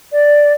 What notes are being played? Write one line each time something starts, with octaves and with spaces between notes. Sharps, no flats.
D5